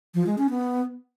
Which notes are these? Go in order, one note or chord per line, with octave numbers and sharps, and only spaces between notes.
F3
G#3
C#4
B3